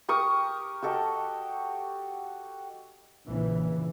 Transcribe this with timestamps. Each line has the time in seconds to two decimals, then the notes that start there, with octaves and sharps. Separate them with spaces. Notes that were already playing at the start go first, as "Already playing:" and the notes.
0.08 G4 A#4 C#6 D#6
0.82 F#4 G4 A4 D#5
3.27 A#1 C#3 E3